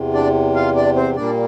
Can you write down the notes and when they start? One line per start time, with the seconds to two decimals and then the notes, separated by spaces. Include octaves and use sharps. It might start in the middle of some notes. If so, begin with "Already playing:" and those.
Already playing: E2 C3
0.14 D4 D5
0.55 F4 F5
0.76 D4 D5
0.96 C4 C5
1.16 A#2 G3 A#3 D4 D5